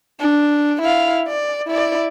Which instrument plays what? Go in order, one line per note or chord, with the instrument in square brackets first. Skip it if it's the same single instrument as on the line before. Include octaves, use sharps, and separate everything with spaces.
[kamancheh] D4
E4 F5
D5
E4 D5